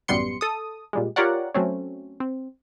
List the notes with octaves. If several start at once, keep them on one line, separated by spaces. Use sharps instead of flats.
A1 F#2 G3 B3 C6 C#7
A4 D#6
A#2 G3 G#3
F4 G4 A#4 C#5 D5 F#5
F#3 A3 C4 C#4
C4